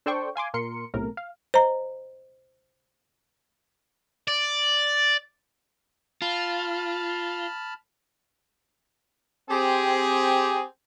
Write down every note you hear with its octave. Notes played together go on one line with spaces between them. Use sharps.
D4 A4 C5 D5 G5 C#6
F5 G#5 C6 D6
A#2 A#4 C6 C#7
B1 A2 C3 A#4
F5
C5 D#5 A#5
D5
F4 A5 B5 F6
C4 G4 G#4